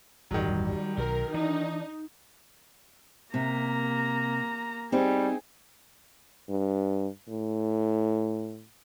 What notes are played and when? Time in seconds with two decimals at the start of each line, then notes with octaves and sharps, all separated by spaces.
0.31 D1 G1 E2 D#3 F#3 G3
0.97 B1 A#4
1.34 E3 D4 D#4
3.34 C3 A#3 A#5
4.92 G3 C4 D#4 G4 G#4
6.50 G2
7.30 A2